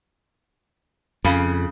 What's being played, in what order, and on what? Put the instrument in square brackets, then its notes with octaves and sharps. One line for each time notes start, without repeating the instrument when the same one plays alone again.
[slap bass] F2 [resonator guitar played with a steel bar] C#3